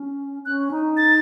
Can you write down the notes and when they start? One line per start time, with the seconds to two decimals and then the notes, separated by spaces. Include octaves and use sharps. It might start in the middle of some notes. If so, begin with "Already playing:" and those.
Already playing: C#4
0.46 C#4 F#6
0.71 D#4
0.97 A6